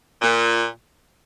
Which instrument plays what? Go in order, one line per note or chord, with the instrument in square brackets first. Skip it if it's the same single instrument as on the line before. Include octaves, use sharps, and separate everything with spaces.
[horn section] A#2